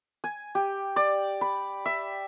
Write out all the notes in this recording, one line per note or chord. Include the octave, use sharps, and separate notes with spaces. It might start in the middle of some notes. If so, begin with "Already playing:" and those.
G#5
G4
D5
B5
E5